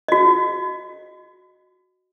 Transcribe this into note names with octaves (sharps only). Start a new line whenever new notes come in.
F#4 D#5